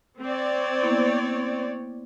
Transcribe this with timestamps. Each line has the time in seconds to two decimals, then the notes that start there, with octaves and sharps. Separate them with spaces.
0.21 C4 C#5 D5
0.82 A#3 B3 E4